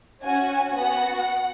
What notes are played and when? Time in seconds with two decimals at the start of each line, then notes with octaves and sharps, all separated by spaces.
0.24 C#4 F#4 G#5
0.76 B3 F#4 F#5